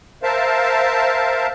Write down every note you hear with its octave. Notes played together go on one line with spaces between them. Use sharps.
A#4 C5 E5 F5 A5